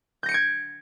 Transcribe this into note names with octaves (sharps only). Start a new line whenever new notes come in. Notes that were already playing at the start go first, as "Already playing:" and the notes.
G6 G#6 A#6 C#7 D7